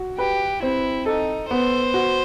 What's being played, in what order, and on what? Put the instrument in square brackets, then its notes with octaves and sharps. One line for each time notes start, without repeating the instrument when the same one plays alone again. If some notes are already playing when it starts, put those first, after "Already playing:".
Already playing: [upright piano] F#4
[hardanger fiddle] G4 [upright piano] B4
[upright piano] C4 [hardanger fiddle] E4
[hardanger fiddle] D#4 [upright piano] A4
[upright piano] B3 [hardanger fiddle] C5
[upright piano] F#4